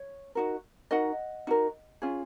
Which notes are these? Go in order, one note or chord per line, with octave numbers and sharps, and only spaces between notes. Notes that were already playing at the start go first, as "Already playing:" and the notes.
Already playing: C#5
D#4 F#4 A#4
D#4 F#4 A#4 D#5 F#5
D#4 F#4 A#4
C#4 F4 G#4